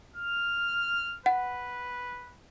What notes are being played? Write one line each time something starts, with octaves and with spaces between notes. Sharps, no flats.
F6
B4 F#5